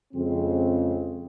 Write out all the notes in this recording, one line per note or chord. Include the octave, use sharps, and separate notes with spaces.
F2 C#3 G#3 C4